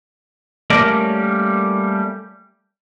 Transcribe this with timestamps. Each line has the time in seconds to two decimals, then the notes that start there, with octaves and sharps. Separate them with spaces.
0.70 G3 A3 A#3 C#4 A#4 D5